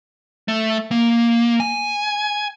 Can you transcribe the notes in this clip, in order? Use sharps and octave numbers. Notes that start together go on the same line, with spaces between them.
A3
A#3
G#5